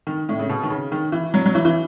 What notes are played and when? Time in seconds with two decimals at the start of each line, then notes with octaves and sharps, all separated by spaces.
0.07 D#3
0.29 A2
0.39 C#3
0.49 B2
0.63 D#3
0.70 C#3
0.92 D#3
1.12 E3
1.34 F#3
1.46 F#3
1.55 E3
1.65 E3